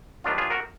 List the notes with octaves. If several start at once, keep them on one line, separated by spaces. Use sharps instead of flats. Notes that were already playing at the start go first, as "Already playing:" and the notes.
D#2 D#3 F#3 B3 D4 F4
F4 G#4
F#4 A#4